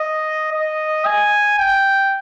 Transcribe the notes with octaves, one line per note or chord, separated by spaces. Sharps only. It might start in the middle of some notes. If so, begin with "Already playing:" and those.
Already playing: D#5
D#5
G#5
G5